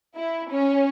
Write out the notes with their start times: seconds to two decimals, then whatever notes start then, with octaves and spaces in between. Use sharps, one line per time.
0.16 E4
0.51 C#4